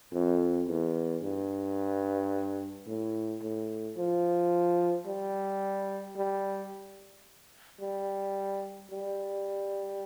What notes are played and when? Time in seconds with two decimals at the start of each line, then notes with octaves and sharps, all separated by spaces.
0.13 F2
0.68 E2
1.22 G2
2.87 A2
3.42 A2
3.97 F3
5.06 G3
6.16 G3
7.81 G3
8.91 G3